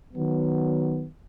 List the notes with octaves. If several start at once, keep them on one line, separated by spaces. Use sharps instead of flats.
D#3 F#3 B3